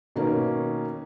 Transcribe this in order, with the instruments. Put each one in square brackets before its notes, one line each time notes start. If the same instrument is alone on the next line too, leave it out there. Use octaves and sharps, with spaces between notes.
[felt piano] B2 D#3 A#3 C#4